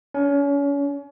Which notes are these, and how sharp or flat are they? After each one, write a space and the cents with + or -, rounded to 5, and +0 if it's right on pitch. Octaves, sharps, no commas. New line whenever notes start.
C#4 +35